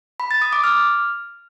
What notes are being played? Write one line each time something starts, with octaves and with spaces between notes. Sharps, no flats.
B5
A6
D#6
D6
F6